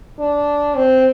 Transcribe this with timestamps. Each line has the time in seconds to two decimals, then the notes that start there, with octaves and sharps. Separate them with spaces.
0.19 D4
0.76 C4